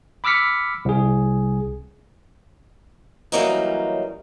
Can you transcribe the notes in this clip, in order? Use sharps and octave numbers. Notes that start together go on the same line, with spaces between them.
B5 D6 E6 F6 B6 C#7
C2 G#4
E3 F#3 G3 A#3 C#4 D#4